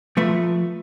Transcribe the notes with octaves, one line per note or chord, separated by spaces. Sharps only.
F3 A3 B4 E5